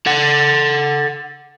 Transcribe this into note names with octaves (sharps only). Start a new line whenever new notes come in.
A4 F#5